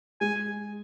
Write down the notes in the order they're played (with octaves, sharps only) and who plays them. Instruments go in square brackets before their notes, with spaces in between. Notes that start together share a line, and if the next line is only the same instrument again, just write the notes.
[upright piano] G#3 [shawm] G#5